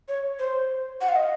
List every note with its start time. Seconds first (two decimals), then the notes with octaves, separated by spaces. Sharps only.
0.08 C#5
0.39 C5
1.01 F#5
1.08 F5
1.16 D#5